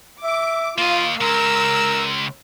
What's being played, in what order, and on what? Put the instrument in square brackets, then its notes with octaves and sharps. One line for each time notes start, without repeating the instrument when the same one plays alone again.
[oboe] E5 [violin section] D6
[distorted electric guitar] A#3 D#5 [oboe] F4 [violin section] F5
[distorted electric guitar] C#2 G#3 [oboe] A#4 [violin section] E6